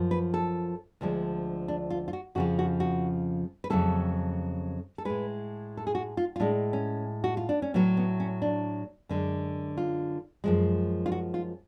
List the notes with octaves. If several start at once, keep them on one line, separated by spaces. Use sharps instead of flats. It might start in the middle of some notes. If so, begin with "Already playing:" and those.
Already playing: F#2 F3
B4
A4
D2 D3 F3 G#3
D4
F4
F4
F#4
F2 C#3 F3 F#4
F#4
F#4
B4
F2 C#3 F#3 A3 A4
A4
A2 G#3 B4
A4
G#4
F#4
F4
F4
A2 G#3 D4
C#4
F#4
F4
D4
C#4
A2 F#3 A3 B3
B3
C#4
D4
F#2 D3 G#3
F4
F#2 F3 G#3
F4
F#4
F4